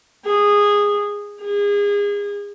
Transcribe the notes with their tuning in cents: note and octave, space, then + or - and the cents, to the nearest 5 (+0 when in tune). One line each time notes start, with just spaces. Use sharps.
G#4 -15
G#4 -30